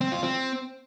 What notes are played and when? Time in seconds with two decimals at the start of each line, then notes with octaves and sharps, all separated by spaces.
0.01 C4
0.12 F4
0.23 C4